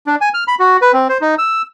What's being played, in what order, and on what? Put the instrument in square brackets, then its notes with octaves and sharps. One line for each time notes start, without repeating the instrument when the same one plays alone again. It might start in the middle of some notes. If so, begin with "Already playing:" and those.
[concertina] D4
G#5
F6
B5
F#4
B4
C4
C5
D#4
E6